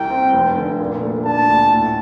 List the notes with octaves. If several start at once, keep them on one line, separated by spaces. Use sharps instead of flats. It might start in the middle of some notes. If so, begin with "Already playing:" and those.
Already playing: C2 G5
C4
F1
D3
A#2
A3
D4 A5
D2
A2